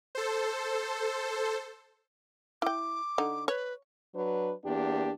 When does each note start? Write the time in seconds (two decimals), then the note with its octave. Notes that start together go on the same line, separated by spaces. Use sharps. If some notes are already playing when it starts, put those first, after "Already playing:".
0.15 A4 C5
2.62 E4 G5 D6
3.18 D3 D#4
3.48 B4 C#5
4.16 F#3 D4 B4
4.64 E2 A#3 D4 G4